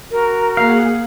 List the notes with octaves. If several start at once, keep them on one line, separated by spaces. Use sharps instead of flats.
F#4 A#4
A#3 G#4 F5 F#5